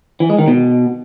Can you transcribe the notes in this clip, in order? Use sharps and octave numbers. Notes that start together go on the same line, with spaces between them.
E3
G#3
D#3
B2